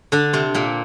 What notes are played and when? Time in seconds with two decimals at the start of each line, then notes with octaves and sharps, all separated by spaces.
0.12 D3 D4
0.33 C3 C4
0.55 A#2 A#3